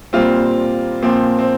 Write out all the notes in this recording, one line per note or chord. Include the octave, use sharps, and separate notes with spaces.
A#2 G3 A#3 C4 F4
A#2 F3 A#3 C4
C4